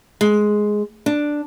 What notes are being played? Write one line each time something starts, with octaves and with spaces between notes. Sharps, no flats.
G#3
D4